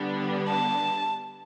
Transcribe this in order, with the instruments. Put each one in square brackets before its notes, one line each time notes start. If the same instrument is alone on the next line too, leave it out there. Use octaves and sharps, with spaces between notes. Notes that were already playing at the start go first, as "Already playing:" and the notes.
Already playing: [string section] D3 G3 B3 D4
[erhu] A5